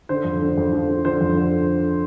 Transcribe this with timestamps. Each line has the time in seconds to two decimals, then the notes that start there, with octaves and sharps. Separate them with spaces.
0.09 D3 C5
0.25 F2
0.42 D3
0.58 F2
0.73 F3
0.89 F3
1.05 D3 C5
1.21 F2
1.37 D3